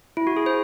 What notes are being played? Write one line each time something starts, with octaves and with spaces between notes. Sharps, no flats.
E4
F#4
G#4
C5